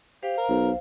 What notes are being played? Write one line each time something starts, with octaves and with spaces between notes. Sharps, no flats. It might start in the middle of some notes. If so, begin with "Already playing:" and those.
G4 C5 F5
A#4
B1